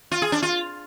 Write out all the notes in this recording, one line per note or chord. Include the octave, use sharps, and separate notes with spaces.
F4
G#4
D4
F4